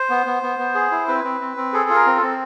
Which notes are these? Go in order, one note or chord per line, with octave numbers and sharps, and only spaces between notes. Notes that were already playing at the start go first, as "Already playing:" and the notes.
Already playing: C5
B3
B3
B3
B3
G#4
E4
C4 B4
C4
C4
C4
G#4 A4
F4
A#4
C4
A4
C4